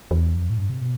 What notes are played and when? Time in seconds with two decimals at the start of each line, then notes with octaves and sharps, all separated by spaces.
0.11 E2
0.35 F2
0.50 A2
0.57 G2
0.70 C3
0.81 B2